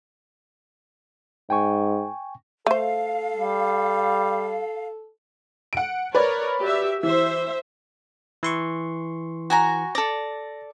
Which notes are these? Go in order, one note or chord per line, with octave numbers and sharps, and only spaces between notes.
G#2 G5 G#5 C#6
A3 A4 C5 F5
G3
F#5 D7
A#4 B4 C#5 D5
F#4 G4 E5
E3 C5 E5
E3 C6 C#6
F#4 G#5 A#5
A4 D5 A#6